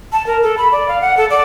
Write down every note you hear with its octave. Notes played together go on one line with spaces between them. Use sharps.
A5
A#4
A4
B5
D5
F5
F#5
A4
D5